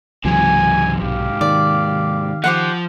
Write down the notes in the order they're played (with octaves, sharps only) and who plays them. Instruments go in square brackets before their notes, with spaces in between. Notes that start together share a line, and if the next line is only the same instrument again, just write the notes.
[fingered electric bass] C#2 E3 F#3 [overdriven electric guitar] G#2 C3 [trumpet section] G#5
[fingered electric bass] B1 [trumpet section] G4 F5
[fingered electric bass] D#3 [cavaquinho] D5
[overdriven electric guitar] F3 [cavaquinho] G4 C5 F#5